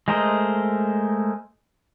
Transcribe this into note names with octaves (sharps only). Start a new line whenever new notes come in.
G#3 A3 A#4 C5 D#5